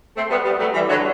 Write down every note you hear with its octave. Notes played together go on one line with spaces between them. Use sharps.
A3 C4
G3 B3
G3 B3
F#3 A3
E3 G3
D3 F#3